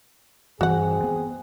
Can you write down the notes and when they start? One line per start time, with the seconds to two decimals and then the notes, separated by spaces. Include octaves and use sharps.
0.61 G2 E3 C4 F#4 G#4 F#5
1.03 B3